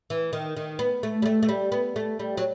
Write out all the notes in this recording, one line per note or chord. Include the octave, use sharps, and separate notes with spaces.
E3
D#3
D#3
B3
A3
G3
A3
A3
G3
B3
A3
G3
F#3